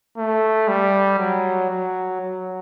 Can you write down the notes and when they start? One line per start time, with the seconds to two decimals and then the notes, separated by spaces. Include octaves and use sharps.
0.18 A3
0.68 G3
1.19 F#3
1.70 F#3
2.21 F#3